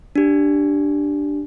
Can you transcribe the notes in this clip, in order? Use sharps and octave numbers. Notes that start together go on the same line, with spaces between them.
D4 G4